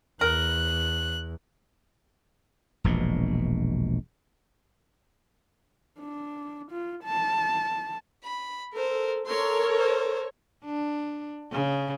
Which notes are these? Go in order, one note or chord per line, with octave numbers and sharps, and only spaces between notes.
E2 A#4 F#6
E1 A#1 B2
D4
F4
A5
B5
A4 A#4 C5
A4 A#4 C#5 C6
C5
D4
C#3